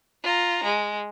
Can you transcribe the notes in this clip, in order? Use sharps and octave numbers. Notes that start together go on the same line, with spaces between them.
F4 A#5
G#3